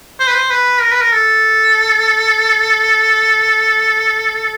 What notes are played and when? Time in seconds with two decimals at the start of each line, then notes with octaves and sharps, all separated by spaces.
0.20 C5
0.27 B4
0.35 C5
0.50 B4
0.81 A#4
0.91 B4
1.01 A#4
1.12 A4